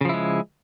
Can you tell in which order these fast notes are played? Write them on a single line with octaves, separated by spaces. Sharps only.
C#3 F3 E4 G#3